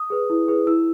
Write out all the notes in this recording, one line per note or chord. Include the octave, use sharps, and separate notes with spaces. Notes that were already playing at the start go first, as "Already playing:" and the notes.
Already playing: D#6
G#4 B4
E4
G#4 B4
E4 E6